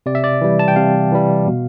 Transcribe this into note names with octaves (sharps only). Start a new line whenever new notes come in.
C3 D5
E5
D5
E3 G3
A5
G5
C3 F5
E3 G3
B2